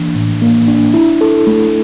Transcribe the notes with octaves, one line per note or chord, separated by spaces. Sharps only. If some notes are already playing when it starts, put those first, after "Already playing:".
Already playing: E3 A#3 D4
A2
A#3
D4
E4
A4
A3